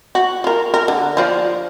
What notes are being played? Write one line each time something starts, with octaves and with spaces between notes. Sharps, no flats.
F#4
F4 A#4
A#4
D3
F3 F4 D5